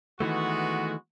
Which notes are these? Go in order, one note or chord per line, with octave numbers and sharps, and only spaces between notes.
D#3 E3 G#3 A3 B3 F#4